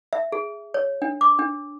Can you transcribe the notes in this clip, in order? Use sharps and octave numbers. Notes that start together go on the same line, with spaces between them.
E5
G#4
C#5
D4
D6
D4